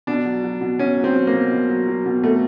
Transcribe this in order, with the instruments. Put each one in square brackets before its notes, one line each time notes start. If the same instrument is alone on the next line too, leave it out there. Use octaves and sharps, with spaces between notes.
[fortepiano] B2 D4
F#3
F#3
B2
B2 C#4
F#3
C4
F#3
A#3
B2
B2
F#3
F#3
B2
B2 A3